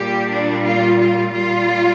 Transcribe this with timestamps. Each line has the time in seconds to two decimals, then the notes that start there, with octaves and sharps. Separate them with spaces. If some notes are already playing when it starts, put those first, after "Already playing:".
Already playing: A#2 G3 G4
0.28 D4
0.63 F4
0.99 F4
1.33 A#2 G3 F4